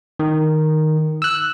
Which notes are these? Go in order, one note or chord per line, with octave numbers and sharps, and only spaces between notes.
D#3
E6 F#6